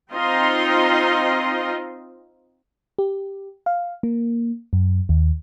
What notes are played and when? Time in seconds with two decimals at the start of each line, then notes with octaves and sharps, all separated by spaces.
0.12 C4 D#4 F4 D#5 C6
2.98 G4
3.66 F5
4.03 A#3
4.73 F#2
5.09 D#2